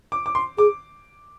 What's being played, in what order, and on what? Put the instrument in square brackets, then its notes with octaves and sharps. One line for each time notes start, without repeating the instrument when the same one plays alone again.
[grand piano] D6
D6
C6
[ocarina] G#4 [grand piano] D6